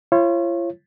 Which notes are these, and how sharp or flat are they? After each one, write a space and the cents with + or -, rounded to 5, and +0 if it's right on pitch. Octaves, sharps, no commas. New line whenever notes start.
F4 -40 C#5 -30